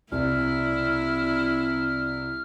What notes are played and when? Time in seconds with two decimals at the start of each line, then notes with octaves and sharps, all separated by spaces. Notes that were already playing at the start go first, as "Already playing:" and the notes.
0.12 C2 E4 F6